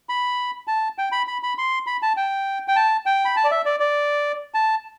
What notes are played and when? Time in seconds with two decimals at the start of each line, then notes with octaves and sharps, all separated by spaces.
0.09 B5
0.68 A5
0.98 G5
1.12 B5
1.27 B5
1.43 B5
1.58 C6
1.87 B5
2.02 A5
2.17 G5
2.68 G5
2.76 A5
3.06 G5
3.25 B5
3.36 A5
3.44 D5
3.51 E5
3.65 D5
3.80 D5
4.54 A5